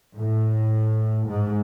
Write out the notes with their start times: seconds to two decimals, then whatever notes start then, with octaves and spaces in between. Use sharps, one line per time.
0.18 A2
1.29 G#2